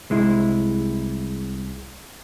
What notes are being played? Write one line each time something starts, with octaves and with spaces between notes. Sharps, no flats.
C2 G#3 E4